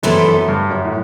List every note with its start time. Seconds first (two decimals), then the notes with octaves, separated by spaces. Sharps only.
0.03 F#2 E3 B3 E4 A4 C5
0.25 F#2
0.48 G2
0.70 F#2
0.84 A2